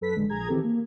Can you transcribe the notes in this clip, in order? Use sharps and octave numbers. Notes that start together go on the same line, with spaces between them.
F#2 A4 B4 B6
A1 D3 G#3
A#1 G#4 A#5 G#6
D#3 E3 C4 G4 A4
A#3